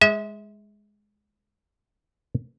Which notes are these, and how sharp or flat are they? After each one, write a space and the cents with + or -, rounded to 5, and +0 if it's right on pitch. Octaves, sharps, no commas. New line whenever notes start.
G#3 +0 E5 -35